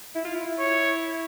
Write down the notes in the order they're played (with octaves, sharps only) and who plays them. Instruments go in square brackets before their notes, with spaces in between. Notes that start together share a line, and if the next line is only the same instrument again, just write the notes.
[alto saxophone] E4
F4
E4
[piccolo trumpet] C#5